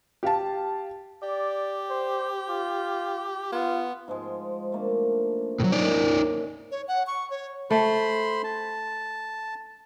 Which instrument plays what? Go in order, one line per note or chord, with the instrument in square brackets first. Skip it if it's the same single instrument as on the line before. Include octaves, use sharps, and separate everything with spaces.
[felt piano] G4 F5 A5
[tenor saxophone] G4 [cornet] D5
[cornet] C5
F4
[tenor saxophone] B3 [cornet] F4
[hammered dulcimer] G#2 F3 G#3
A3 A#3 D4
[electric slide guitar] A2 F#3
[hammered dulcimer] D#3 [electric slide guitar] D#4 C#5 D5
[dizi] C#5
F#5
C#6
C#5
[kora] A3 [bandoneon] C5 B5 C6
[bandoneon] A5